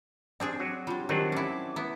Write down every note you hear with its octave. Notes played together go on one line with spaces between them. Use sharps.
C4 D4 G#4 C5 D5
F#3 F#4
G3 D4 F4
D#3 F#3 C4 D4 G4
C#4 E4 D6
B3 E4